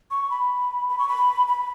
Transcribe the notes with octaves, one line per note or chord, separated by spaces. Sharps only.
C#6
B5
B5
C#6
B5
B5